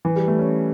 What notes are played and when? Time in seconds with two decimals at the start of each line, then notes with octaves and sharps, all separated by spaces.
0.05 E3
0.16 G3
0.28 A3
0.39 C#4